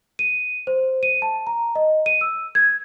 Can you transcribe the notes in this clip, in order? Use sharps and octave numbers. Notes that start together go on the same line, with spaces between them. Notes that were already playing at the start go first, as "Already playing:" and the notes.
D#7
C5
D#7
A5
A#5
D#5
D#7
E6
G#6